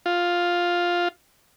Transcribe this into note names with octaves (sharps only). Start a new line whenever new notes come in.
F4